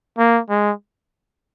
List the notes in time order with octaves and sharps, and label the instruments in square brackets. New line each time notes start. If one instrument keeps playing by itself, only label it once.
[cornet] A#3
G#3